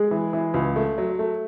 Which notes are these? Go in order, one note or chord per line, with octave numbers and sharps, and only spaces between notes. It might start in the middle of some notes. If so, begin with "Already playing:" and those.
Already playing: G#3 G#4
E3
E3
C#2
A3
F#3
A3